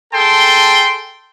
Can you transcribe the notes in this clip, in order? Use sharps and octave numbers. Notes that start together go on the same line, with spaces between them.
G#4 A4 G5 A5 C6